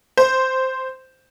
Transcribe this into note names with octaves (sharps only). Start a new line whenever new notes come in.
C5